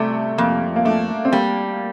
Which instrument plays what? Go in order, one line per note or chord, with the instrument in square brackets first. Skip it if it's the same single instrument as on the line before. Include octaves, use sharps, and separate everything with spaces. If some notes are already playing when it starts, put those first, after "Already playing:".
Already playing: [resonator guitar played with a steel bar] C3 [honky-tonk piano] G3 A3
[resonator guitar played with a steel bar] F2 [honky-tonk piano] A#3
[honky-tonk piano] A#3
[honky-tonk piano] A3 [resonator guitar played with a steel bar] D4
[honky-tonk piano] C4
[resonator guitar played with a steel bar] G3 [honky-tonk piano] A#3